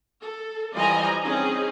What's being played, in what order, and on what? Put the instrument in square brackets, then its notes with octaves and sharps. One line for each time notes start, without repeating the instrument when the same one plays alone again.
[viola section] A4
E3 F3 G3 D#5 G#5 A#5
C4 C#4 D#4 G#4